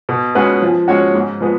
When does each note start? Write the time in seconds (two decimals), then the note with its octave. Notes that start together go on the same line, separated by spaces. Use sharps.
0.09 B2
0.35 G#3 C#4 F#4 B4
0.62 F3
0.88 G#3 C#4 F#4 C#5
1.14 G#2
1.41 F3 G#3 B3